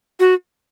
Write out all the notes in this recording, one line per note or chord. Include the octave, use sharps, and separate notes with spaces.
F#4